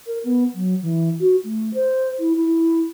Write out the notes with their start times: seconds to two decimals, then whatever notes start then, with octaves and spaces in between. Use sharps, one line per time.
0.06 A#4
0.24 B3
0.54 F#3
0.82 E3
1.20 F#4
1.44 A3
1.74 C5
2.19 E4
2.36 E4